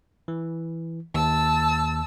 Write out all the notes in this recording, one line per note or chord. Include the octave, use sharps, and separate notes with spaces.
E3
D#2 A5 E6